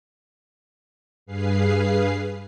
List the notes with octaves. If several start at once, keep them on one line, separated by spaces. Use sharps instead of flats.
G2 G#4 B4 F5 C7